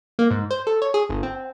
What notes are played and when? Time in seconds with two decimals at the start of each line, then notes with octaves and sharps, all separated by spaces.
0.19 A#3
0.31 G#2
0.51 C5
0.67 A4
0.82 C#5
0.94 G#4
1.09 G1
1.23 C4